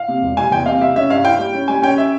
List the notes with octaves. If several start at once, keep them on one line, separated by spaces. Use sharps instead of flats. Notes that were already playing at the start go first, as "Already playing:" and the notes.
Already playing: F5
C3
E1
G3 G#5
E2 G5
C3 F5
G3 E5
C#4 E5
G2 F5
E4 G5
G3
C#4
G3 G#5
C#4 G5
E5